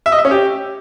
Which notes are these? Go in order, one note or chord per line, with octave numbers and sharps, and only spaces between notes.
E5
D#5
E5
C#4
G4